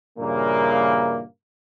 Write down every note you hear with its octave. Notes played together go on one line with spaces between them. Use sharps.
G2 A#2 C#3 E3 A#3